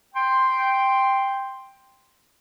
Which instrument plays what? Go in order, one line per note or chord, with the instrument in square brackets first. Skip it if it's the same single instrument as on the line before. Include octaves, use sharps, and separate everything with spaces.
[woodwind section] G5 C6